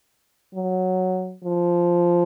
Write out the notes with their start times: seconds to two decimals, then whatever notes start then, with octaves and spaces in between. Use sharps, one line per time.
0.54 F#3
1.44 F3